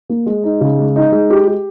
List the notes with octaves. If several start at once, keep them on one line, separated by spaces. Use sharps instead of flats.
A#3
G#3
D#4
C#3
G#3
D#4
G#3
G4
G4